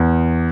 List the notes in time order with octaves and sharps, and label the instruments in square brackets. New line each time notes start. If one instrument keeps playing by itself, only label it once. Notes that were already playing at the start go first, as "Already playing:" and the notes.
Already playing: [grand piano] E2